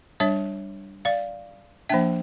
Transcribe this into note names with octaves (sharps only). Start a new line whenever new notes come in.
G3 D4 C#5 E5
D5 F5
F3 A#3 D4 E5 G5